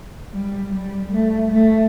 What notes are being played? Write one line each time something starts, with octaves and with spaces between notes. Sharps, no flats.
G3
G3
A3
A3